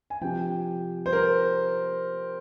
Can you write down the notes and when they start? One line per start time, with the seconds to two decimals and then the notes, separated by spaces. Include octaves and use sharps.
0.10 G#5
0.21 C3 F3 G5
1.06 C5
1.13 A#4